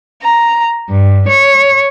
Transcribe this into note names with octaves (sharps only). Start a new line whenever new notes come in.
A#5
G2
C#5